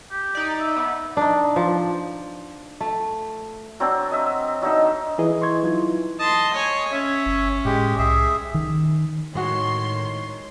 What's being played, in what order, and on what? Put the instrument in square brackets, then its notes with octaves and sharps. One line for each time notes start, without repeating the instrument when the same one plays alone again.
[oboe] G4
[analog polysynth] D#4 D5
[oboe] E5
[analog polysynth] B3
[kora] D4 D#4
F3
A3
[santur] F#3 C4 D4
D#5 E5
F#3 D4 D#4 E5
[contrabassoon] E3 [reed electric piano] G#4 D#5
[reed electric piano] C6 C#6 G#6
F#3 D#4 F4
[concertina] D#5 D#6 [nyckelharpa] A5 C6
[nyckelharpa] C#5 G#5
[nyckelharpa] C#4 [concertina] C#5 E5
[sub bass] G1
[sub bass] A2 [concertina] G#3 G4
[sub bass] C2 [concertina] G#4 E5
[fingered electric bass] D#3
[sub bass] A2 [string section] D#3 C6 [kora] G#3 F#4 [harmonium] C#5